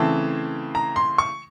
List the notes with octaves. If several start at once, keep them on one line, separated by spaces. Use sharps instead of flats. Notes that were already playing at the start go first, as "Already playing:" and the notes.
Already playing: C#3 E3 A3 C4 A5
A#5
C6
C#6